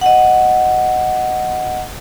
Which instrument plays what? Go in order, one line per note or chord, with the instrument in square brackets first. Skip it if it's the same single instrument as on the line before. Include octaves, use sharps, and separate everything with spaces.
[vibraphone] D#5 F#5